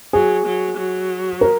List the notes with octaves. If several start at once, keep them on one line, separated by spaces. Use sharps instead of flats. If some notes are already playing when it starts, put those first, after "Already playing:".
F#3 G#4
F#3
F#3
A#4